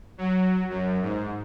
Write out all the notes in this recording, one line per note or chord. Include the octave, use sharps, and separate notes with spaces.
F#3
F#2
G#2